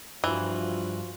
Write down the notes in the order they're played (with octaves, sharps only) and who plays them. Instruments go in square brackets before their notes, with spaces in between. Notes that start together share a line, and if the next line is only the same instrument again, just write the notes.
[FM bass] G2 [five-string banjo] E3 [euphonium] F3 [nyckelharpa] F4 F#4